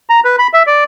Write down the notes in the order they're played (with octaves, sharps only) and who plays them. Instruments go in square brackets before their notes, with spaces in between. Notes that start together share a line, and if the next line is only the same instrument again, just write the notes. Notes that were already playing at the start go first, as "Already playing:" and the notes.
[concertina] A#5
B4
B5
E5
D5